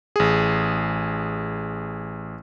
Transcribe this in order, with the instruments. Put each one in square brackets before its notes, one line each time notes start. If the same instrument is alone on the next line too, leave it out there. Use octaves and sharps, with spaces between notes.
[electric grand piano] A1 G#4